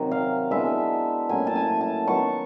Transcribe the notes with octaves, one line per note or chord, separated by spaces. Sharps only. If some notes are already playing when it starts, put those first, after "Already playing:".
Already playing: C3 D#3 F#3
F5
E3 G#3 B3 D4 E5
A2 F#3 A#3 C#4 G#5
A5
G#5
A5
D#3 F#3 B3 C#6